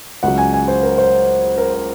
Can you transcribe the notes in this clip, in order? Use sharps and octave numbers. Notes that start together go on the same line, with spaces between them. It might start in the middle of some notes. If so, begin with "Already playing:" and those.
C#2 C#3 F#3 F#5
G#5
G#5
C5
A#4
C5
A#4
C5